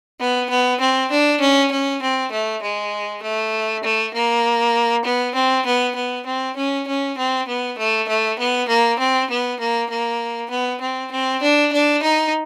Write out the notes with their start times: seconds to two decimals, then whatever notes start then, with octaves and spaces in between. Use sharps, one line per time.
0.20 B3
0.50 B3
0.80 C4
1.11 D4
1.41 C#4
1.71 C#4
2.02 C4
2.32 A3
2.62 G#3
3.23 A3
3.83 A3
4.14 A#3
5.05 B3
5.35 C4
5.66 B3
5.95 B3
6.26 C4
6.56 C#4
6.87 C#4
7.18 C4
7.48 B3
7.78 A3
8.08 A3
8.39 B3
8.68 A#3
8.99 C4
9.30 B3
9.60 A#3
9.90 A#3
10.50 B3
10.81 C4
11.12 C4
11.42 D4
11.73 D4
12.02 D#4